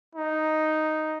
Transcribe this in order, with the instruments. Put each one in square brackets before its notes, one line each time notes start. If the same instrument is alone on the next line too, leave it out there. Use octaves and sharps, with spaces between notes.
[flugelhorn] D#4